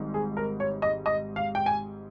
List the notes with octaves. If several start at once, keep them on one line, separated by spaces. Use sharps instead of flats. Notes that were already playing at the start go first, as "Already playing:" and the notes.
Already playing: G#1 G#2 G3
G#4
A#4
C#5
D#5
D#5
F5
G5
G#5